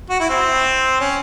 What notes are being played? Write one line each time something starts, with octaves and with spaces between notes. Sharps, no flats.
F#4
E4
C4
C#4